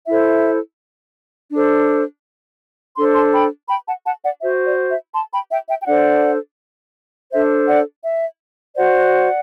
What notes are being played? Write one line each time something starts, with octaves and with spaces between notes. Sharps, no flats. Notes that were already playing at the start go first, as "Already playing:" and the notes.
E4 A4 C5 E5
D4 A4 C5
D4 A4 C5 C6
A5 C6
G5 B5
G5 B5
F#5 A5
F#5 A5
D5 F#5
F#4 C5 E5
D5
E5
A5 C6
G5 B5
E5 G5
E5 G5
G5
D4 A4 C5 D5 F#5
D4 A4 C5 E5
D5 F#5
E5
F#4 C5 D5 F#5